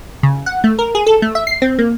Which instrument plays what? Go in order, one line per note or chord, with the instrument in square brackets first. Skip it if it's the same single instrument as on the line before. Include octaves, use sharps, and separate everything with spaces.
[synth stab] C#3
F#5
A3
A#4
G#4
A4
A3
E5
C7
C4
A#3